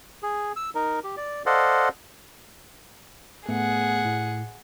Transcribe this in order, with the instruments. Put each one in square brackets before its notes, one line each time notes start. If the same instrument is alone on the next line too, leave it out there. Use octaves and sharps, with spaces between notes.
[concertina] G#4
E6
D#4 A#4
G4
D5
A4 C5 D5 D#5 F5 F#5
[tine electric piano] A2 A3 B3 [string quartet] G#4 F#5
[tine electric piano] A2